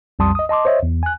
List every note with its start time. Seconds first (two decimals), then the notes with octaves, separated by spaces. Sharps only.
0.19 B1 F2 G3 A5 C6 D#6
0.35 D#5 D#6
0.49 D#5 A5 C6 D6
0.65 C5 C#5 D#5 E5
0.83 E2
1.03 G#5 F#6